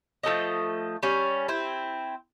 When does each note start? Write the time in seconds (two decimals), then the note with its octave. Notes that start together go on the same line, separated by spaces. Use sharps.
0.23 F3 A3 A4 D#5
1.03 G3 C#4
1.48 C4 E4